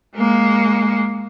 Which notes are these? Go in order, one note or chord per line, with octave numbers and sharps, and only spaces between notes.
G#3 A#3